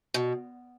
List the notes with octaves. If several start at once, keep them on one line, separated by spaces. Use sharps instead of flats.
B2